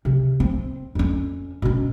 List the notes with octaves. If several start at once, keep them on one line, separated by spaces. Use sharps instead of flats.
C3
C4
F2 C#4
B2 C#4